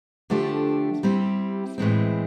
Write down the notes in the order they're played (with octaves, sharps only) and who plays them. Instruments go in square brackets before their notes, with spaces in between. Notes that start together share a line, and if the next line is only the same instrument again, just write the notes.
[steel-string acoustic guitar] D3 F3 A3 D4 G4
G3 C4 E4 G4
A2 E3 G#3 C4